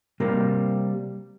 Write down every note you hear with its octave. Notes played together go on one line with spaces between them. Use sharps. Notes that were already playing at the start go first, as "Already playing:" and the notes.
C3 G3 A#3 C4 A#4